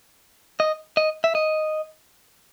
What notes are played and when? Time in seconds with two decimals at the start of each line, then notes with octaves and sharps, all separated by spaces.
0.60 D#5
0.97 D#5
1.24 E5
1.35 D#5